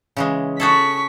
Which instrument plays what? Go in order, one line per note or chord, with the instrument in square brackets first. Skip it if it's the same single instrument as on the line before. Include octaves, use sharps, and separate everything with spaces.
[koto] C#3 E3 G#3
[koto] F#4 G#4 A4 [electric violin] C#6 B6